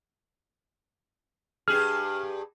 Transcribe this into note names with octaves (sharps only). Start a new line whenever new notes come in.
G2 G4 G#4 F6